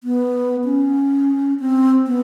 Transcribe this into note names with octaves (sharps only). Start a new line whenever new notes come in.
B3
C#4
C4
B3